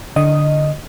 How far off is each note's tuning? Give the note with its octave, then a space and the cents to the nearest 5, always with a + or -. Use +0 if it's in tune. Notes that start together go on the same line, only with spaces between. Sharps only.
D3 +0 D#5 +0